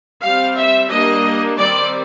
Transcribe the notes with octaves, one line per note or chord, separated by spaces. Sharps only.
G3 C4 F5
E5
G3 A#3 D4 D#5
D#3 G3 C4 D5